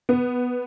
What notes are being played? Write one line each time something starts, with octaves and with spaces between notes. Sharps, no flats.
B3